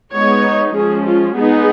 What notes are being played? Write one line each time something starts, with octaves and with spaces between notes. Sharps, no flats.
G#3 B3 D#4 C#5
F3 G#3 C#4 G#4
F4
G#3 B3 D#4 G#4